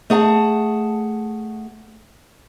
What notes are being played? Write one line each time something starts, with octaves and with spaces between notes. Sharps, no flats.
A3 G#4 F#5 A5